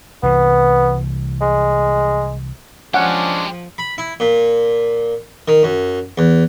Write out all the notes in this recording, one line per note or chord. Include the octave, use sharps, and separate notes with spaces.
C2 E3 B3
G#3
F3 G#3 C#4 D4 G4 F#5
B5
E4
A#2
D#3
F#2
E2